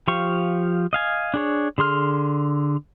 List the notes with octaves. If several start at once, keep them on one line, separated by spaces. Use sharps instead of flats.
F3 G4 F5 C#6
D#5 F5 G#5
D4 G#4 C#5
D3 G#4 C6 F6